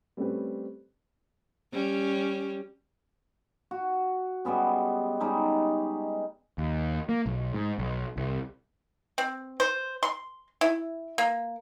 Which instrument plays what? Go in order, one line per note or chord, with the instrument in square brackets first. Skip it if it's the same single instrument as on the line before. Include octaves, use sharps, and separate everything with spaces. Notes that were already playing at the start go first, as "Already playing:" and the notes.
[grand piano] G3 A3 C4 C#4 G4 B4
[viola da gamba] G3 C#4
[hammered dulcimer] F#4
G3 G#3 B3 C#4
G3 G#3 C#4 D#4
[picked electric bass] D#2
A#3
B1
G#2
B1
C2
[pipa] C4
C5
C6
E4
A#3